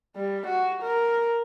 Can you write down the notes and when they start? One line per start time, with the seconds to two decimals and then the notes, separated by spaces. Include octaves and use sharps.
0.16 G3
0.47 F#4
0.82 A#4